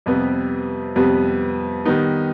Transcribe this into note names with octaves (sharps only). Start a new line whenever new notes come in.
F2 C3 G3 B3
F2 C3 G3 B3
D#3 G3 B3 D#4